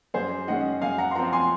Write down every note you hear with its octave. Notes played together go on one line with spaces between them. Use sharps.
F#2 G#4 C5
D#3 G#3 C#4 D#5 F#5
F#2 F5 G#5
F#5 A#5
C6
F3 C4 F#5 A#5
G#5 C6